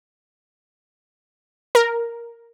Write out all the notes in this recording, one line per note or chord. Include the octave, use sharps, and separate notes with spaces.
A#4